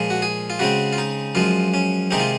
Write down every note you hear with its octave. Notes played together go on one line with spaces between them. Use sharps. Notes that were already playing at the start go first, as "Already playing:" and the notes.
Already playing: A#2 F3 G#3
F#4
G#4
F4
C#3 G#3 C4 F#4
F4
D#4
F#2 F3 G#3 F4
C#4
C3 D#3 G#3 C4 D#4
F4